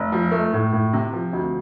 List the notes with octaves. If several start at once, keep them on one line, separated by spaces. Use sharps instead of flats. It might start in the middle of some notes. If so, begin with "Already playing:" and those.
Already playing: F1
F3
A3
A2
A2
C3
F3
D2